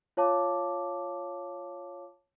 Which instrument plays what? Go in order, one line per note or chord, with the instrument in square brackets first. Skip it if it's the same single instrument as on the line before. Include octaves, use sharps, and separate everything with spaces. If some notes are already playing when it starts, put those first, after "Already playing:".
[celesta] F4 C#5 F5 A5 D6